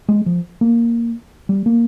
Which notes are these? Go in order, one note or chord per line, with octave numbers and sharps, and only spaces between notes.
G#3
F3
A#3
G3
A#3